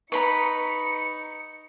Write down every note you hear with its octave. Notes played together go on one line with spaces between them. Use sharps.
D#4 B4 A#5 B5 C#6 C#7